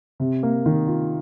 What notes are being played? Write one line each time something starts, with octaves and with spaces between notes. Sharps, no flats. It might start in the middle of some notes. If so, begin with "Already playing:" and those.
C3
A#3
D#3
F4